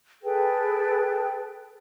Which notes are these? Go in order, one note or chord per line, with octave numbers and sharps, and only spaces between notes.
G#4 A4 B4 G5